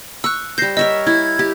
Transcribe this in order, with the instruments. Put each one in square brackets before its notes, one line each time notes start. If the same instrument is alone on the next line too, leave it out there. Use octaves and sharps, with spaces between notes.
[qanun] C#6 [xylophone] E6 F#6
[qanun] G3 C5 [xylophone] G6 A#6 C7
[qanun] A#4 C#5 E5 [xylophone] D#5
[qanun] E4 [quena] G#6
[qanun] G4